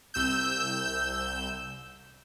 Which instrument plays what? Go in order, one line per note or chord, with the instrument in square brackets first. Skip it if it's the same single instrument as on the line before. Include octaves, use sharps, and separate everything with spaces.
[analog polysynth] C2 E6 G6